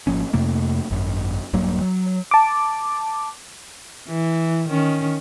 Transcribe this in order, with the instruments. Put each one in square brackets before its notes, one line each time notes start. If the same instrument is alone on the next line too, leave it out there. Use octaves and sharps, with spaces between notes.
[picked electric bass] G#1 F3 A#3 C#4
F2 C3 A3 A#3
G#1 F#2
D#1 G2 F#3 A#3
F#3
[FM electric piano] A5 D6
[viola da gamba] E3
D#3 C#4